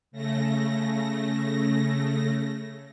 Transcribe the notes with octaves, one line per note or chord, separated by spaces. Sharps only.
C#3 A3 A#6